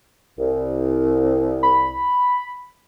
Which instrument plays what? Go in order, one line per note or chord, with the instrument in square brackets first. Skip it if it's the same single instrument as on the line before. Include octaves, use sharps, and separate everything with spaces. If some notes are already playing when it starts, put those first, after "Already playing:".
[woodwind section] C2
[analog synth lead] B5